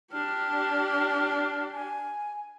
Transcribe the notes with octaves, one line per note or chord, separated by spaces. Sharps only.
D4 G4 F6
G#5